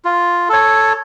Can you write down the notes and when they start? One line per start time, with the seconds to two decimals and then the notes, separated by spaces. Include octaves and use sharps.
0.05 F4
0.49 A4 C#5